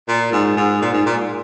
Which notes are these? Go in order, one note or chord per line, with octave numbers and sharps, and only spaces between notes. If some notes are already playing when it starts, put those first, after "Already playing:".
A#2
G#2
G#2
A#2
G#2
A#2